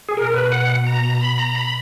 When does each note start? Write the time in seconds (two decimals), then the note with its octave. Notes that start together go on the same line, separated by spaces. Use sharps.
0.09 G#4
0.17 B2 A#4
0.34 B4
0.52 F#5
0.87 A#5
1.04 A#5
1.15 A#5
1.21 B5
1.38 A#5
1.55 B5